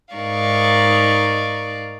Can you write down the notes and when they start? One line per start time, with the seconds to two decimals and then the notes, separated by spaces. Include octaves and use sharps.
0.14 G#2 D#4 A#4 D5 F5 C#6